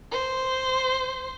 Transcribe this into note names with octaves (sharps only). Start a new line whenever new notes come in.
C5